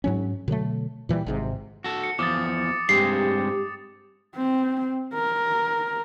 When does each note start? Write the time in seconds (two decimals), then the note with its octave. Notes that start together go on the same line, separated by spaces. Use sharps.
0.04 G#2 F#3 C#4
0.48 B2 D3 F#3 A3
1.09 A#2 E3 F#3 G3
1.27 G#1 G#2 C3
1.84 F#4 A4
2.03 C#7
2.19 E2 F3 D6 D#6 A6
2.89 G2 G#3 C4 G4 C7
4.36 C4
5.14 A#4